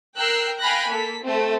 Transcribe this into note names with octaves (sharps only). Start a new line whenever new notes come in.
A#4 G5 E6 F#6 C7
F5 G5 G#5 B5 F#6 A#6
A#3 A4 B6
A3 C4